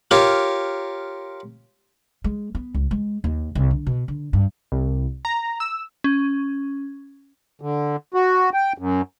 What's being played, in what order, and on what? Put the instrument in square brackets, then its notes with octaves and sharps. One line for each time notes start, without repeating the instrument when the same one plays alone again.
[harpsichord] F4 G4 A#4 C#5
[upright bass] G#3
B3
C#2
G#3
D#2
C2
D3
B2
D3
G2
[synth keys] C2
A#5
E6
[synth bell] C#4
[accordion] D3
F#4
G5
F#2